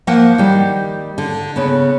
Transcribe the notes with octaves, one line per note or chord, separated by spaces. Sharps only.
F3 A#3 A#4 C5 F#5
D#3 G3
D3
C#3 B3